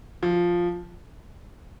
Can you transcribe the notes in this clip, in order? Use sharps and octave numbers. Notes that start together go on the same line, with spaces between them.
F3